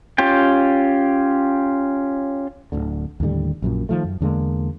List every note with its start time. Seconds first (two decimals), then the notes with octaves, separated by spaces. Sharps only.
0.18 C#4 F4 G4 G5
2.72 D1 G#1 D2 D3
3.20 D#2 A2 D3 G3
3.62 A#1 F#2 A#2
3.89 D#3 F3 A3
4.04 F#2
4.21 E2 D3 G#3 A#3